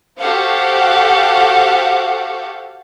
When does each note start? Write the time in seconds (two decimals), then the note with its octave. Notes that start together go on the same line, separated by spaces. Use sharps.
0.18 F#4 G4 A4 C5 F5 F#5